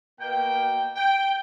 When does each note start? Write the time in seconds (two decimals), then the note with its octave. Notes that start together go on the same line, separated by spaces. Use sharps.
0.19 B2 A#3 G5
0.95 G5